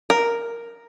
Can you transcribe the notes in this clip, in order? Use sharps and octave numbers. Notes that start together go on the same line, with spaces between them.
A#4